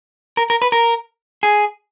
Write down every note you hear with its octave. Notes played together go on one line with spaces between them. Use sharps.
A#4
A#4
B4
A#4
G#4